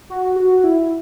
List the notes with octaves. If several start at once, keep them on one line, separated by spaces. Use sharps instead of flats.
F#4
F#4
E4